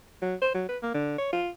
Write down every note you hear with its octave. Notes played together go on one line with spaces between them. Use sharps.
F#3
C5
F#3
B4
A#3
D3
C#5
F4